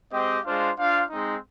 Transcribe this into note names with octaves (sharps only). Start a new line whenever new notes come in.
G#3 C4 G4 C5 D#5
G#3 D4 F4 C5 F5
D4 F4 C5 F5
G#3 C4 D#4